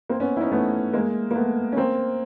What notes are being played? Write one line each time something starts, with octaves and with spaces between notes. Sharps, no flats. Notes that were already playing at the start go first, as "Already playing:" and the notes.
A#3 C4
B3 C#4
E4
C#4 D#4
A3 B3
G#3 A#3
A#3
A3 B3
C#4
A#3 C4